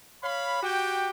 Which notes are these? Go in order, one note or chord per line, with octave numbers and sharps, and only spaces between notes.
C#5 F5 B5
F#4 G4 G5